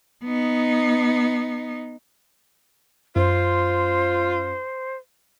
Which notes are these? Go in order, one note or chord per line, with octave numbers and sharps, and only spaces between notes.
B3 D#4
F#2 F4 C5